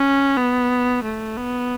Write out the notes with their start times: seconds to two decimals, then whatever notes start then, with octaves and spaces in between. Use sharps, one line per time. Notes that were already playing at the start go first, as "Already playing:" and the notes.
Already playing: C#4
0.38 B3
1.04 A3
1.38 B3